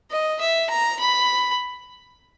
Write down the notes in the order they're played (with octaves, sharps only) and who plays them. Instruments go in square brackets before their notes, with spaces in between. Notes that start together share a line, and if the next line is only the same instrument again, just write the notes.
[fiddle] D#5
E5
A#5
B5